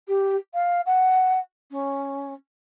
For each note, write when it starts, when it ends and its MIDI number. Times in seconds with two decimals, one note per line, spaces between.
0.07 0.36 67
0.54 0.81 77
0.86 1.38 78
1.71 2.33 61